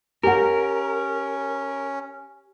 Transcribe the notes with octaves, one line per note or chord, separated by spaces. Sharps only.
C#4 G4 A#4 F#5